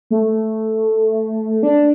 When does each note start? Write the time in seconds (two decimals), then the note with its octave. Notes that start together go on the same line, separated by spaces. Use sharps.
0.11 A3
1.63 D4